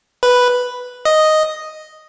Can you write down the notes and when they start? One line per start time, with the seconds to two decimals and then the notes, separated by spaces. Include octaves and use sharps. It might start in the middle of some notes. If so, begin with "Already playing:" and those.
0.23 B4
1.05 D#5